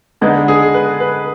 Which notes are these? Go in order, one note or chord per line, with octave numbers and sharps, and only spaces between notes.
D3 G#3 B3 D#4
G#4
B4
B4